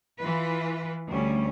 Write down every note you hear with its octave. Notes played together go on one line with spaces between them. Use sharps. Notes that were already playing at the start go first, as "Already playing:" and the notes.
E3 F4 B4
D2 G3 C#4